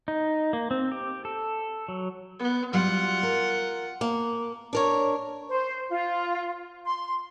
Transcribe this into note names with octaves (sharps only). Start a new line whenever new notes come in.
D#4
A#3
C4
G4
A4
F#3
B3
F#3 G3 F4 F#5
A#4
A#3
D4 A#4 C#5
C5
F4
C6